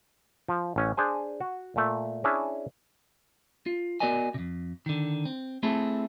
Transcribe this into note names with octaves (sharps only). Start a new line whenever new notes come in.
F3
A1 C#4
D4 G#4 C5 G#5
F#4
A#2 A3
C#4 D4 E4 G#4 E5
F4
B3 F#4 A#4 D5 D#5 G#5
F2 C3
D3 D#3
C4
A3 C4 E4 G#4 A4